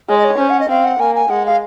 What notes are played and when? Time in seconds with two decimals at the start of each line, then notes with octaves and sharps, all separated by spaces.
0.09 G#3 C#5
0.17 D#5
0.24 C#5
0.39 C#4 C5
0.49 F#5
0.60 D#5
0.69 C4 F5
0.84 F#5
1.00 A#3 G#5
1.15 G#5
1.30 G#3 F#5
1.45 F5